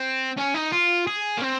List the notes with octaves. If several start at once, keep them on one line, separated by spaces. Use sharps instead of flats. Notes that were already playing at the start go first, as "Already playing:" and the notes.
Already playing: C4
C#4
D#4
F4
G#4
A#3
C4